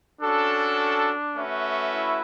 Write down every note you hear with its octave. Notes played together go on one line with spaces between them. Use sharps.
C#4 D4 F#4 A4
A3 C#4 F#4 B4 E5
E4